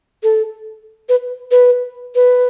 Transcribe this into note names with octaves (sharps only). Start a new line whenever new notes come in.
A4
B4
B4
B4